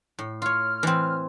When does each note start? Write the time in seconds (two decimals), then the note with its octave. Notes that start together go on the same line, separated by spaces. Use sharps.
0.19 A2
0.42 F4 C#5 F6
0.83 E3 C4